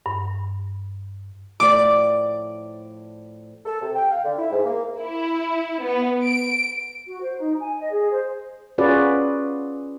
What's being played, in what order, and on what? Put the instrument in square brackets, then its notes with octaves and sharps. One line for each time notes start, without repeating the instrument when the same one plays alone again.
[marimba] G2
[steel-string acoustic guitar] A2 F3 D5 [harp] D6
[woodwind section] A4
C3
G5
F5
D3
E4
G#2
A#3
[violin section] E4
B3
D7
[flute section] F#4
C5
D#4
G#5
D#5
G#4
C5
[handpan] C#4 F4 F#4 G#4 B4 D5